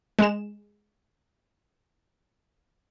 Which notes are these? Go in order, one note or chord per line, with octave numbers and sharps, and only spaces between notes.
G#3 E7